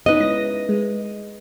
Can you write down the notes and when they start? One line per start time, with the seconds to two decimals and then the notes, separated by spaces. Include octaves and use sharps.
0.06 B3 C#4 D#4 B4 D#5
0.20 G#3 E4 A#6
0.69 G#3